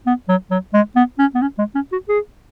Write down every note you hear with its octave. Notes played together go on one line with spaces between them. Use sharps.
B3
F#3
F#3
G#3
B3
C#4
B3
C#4
G#3
C#4
F#4
G#4